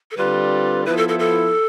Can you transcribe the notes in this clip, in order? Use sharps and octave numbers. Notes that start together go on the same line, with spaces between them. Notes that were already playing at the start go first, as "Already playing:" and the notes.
A4
D3 G3 C4 F4 B4
F3 B3 E4 B4
A4
A4
A4